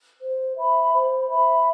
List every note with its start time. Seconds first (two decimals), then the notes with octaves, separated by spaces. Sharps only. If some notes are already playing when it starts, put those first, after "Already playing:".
0.20 C5
0.56 E5 B5
0.93 C5
1.29 E5 B5